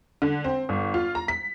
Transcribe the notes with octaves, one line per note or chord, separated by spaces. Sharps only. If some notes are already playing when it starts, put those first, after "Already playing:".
D3
C4
G1
F4
A#5
B6